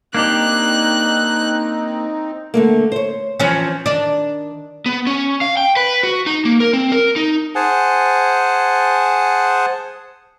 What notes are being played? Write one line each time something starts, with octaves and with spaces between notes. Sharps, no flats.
A#3 C4 D4 D#4 G4 F#6
D3 A3 A#3
C5 C#5
E3 F3 C#4
D#3 D4
B3
C#4
F5
G5
B4
F#4
D#4
A#3
A#4
C4
A#4
D#4
G#4 C5 F#5 G#5 A5